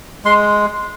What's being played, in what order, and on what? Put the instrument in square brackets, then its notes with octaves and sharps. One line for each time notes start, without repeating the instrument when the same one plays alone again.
[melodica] G#3 C6